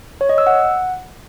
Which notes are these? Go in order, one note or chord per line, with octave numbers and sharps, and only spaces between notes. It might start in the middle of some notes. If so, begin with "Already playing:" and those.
C#5
D#5
E6
F#5